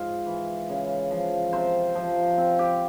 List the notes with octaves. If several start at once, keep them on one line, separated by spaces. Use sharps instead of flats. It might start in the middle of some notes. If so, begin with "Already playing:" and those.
Already playing: G#2 F4
E3
C#3
F3
C3 C5
F3
C4
G4